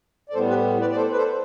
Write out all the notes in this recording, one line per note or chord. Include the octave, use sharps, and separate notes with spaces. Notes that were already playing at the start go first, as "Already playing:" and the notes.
D5
A2 G3 B3 A4 C5
G4 B4
B4 D5
D5
A4 C5
B4
A4 C5